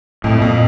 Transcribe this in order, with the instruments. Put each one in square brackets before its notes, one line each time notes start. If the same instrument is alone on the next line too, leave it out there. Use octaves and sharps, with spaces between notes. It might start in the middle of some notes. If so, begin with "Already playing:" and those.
[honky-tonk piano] F2 [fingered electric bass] A2
[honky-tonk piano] F2 [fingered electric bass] A#2